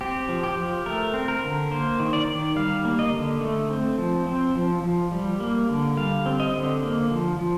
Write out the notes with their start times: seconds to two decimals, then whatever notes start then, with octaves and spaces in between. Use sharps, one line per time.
0.01 C4 G4
0.29 F3
0.43 G4
0.57 F3
0.86 A3 A#4
1.14 C4
1.28 A#4
1.43 D3
1.71 A#3 C5
2.00 D#3
2.13 D5
2.28 D#3
2.56 G3 F5
2.85 A#3
2.99 D#5
3.13 D3
3.41 A3
3.70 C4
3.98 F3
4.27 C4
4.55 F3
4.84 F3
5.11 G3
5.40 A#3
5.69 D3
5.97 G3 F5
6.26 C4
6.40 D#5
6.54 D3
6.83 A#3
7.11 F3
7.39 F3